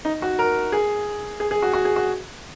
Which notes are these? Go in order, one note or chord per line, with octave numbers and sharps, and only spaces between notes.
D#4
F#4
A#4
G#4
G#4
G#4
F#4
F#4
G#4
F#4